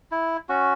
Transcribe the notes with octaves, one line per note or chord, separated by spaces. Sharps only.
E4
C#4 F#4